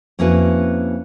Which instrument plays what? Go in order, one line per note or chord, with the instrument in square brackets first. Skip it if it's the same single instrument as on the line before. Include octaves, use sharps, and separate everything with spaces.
[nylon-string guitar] F2 A#3 C#4 E4 F#4 B4